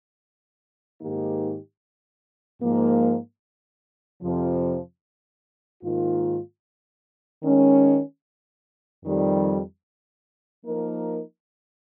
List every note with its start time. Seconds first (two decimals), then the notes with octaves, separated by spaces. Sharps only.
1.00 G#2 D#3 A#3 D#4 G4
2.60 G#2 F3 A#3
4.22 F2 C3 F3
5.82 G#2 D#3 A#3 F4
7.43 D#3 G#3 C#4
9.04 F2 D#3 G3
10.64 F3 A#3 D#4 A#4